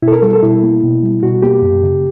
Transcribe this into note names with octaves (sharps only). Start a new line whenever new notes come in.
B2 E4
A4
A#4
G3 A4
A4
B2 E4
A#3
B2
G3
B2 F#4
A#3 G4
F#2
C#3